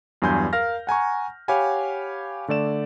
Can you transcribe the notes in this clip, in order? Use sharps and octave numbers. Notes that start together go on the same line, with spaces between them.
E2 G2 F#3 G#5 C6 G6
A#4 F5 F6 A#6
F#5 G#5 A#5 C#6
G4 C#5 F5 F#5 G#5 B5
D3 A3 D5 E7